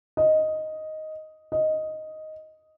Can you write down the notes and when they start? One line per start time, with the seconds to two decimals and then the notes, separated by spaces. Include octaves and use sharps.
0.17 D#5
1.52 D#5